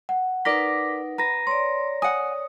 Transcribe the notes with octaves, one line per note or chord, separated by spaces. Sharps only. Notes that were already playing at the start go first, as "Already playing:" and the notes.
F#5
D#4 A#4 B4 D5 D6 A#6 B6
B4 A#5 A#6
C#5 D5 C6
F#5 G#5 D#6